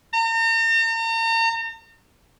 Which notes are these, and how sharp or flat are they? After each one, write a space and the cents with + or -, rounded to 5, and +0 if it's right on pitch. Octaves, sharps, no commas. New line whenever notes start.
A#5 -40